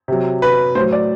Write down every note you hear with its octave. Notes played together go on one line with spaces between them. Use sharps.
C3 F#3
B4
A2 C5
F#3
D5